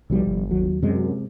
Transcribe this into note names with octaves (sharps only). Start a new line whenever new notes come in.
B1 C3 F3 G3
G1
D#2 F#3
F#2 C3 G#3